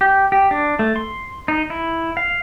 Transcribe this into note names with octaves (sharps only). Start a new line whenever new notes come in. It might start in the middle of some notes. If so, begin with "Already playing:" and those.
G4
G4
D4
A3
C6
D#4
E4
F5